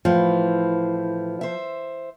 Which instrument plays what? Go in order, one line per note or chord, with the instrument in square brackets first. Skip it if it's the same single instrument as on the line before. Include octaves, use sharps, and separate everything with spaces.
[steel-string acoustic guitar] A2 E3 [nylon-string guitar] F3
[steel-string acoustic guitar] C5 E5